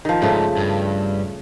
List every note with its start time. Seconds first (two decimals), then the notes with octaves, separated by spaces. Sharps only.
0.05 D#3 F3
0.22 G#2 C#3 A3
0.57 G2